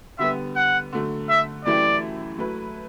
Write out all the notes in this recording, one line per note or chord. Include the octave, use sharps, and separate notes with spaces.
D3 G3 B3 E5
F#5
D3 F#3 A3
E5
F#2 E3 A3 E4 G4 D5
F#3 A3 E4 B4